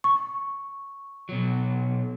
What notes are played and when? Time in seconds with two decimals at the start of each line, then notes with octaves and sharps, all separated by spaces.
0.04 C#6
1.29 B2 F#3